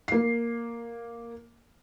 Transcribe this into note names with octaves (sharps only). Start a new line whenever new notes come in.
A#3 C7